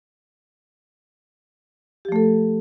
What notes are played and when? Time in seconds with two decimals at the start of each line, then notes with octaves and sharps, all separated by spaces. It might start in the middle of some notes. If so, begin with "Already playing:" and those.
2.05 G4
2.09 F3
2.12 A3
2.16 A4